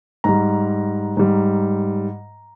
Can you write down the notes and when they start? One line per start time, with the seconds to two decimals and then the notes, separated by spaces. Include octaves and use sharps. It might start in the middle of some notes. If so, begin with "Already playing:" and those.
0.24 G#2 G3 A#5
1.17 G#2 G3